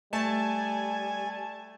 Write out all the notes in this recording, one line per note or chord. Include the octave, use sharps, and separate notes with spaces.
G3 A3 G#5 A5